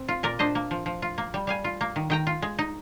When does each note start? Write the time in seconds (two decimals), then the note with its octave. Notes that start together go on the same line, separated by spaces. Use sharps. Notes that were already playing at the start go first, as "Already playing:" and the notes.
Already playing: C4
0.08 F4
0.23 A#2 A#4 D5
0.39 D4 C5 D#5
0.55 A#3
0.71 F3
0.86 F3
1.02 F4
1.18 A#3
1.34 G3
1.47 G3 F5 G#5
1.64 F4
1.81 A#3
1.96 D#3
2.10 D#3 G5 A#5
2.27 F4
2.42 G#3
2.59 D#4